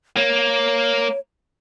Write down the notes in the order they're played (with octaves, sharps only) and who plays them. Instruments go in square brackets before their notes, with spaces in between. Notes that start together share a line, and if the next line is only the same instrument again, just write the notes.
[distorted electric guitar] A#3 [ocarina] C#5